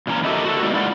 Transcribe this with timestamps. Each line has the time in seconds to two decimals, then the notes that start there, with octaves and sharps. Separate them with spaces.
0.07 A#2 E3 C#4 A#5
0.25 F#4 G4 A4 A#4 D#5 E5
0.45 F#4 A4
0.62 G#3 A3 B3 D#4 F#4 D5
0.74 G#3 E4 F4 D5 F#5